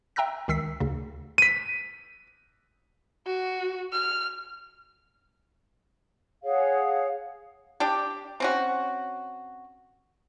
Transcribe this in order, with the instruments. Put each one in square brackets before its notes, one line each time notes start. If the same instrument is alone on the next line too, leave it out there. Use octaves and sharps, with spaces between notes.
[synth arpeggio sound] E5 G5 A#5 E6 F#6 A#6
C#2 D#3 E6 B6 C7
D2 C#3
[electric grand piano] B6 D#7
[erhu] F#4
F6
[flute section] G#4 C#5 F5 F#5
[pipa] D4 G4
C4 C#4 F#4